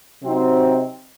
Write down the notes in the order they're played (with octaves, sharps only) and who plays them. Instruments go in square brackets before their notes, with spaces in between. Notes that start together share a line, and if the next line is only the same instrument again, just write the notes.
[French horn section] C3 F#3 C4 D#4